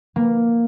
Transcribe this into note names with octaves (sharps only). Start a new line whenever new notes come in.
A#3